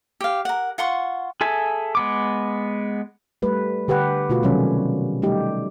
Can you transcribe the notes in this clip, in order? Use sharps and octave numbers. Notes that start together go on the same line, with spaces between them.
G4 F5
A#4 F#5
F4 F#5 C6 C#6
G#4 A4 E5 G#5
G#3 B3 D6
G3 A3 B4
D3 G4 B4 F#5
B2 A3 F4 F#4 B4
C3 D#3 F#3 G3 A3 C#4
G3 A3 D#4 G4